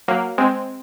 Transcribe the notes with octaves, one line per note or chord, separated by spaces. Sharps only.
F#3 A#3
G#3 C4